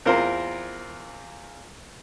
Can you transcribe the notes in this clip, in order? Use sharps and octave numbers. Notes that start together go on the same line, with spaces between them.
E2 C4 F4 A#4 C5